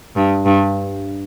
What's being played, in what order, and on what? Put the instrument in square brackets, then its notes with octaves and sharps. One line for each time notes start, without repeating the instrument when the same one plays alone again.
[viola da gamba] G2
G2